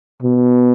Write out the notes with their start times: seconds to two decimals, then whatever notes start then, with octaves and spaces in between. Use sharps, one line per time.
0.23 B2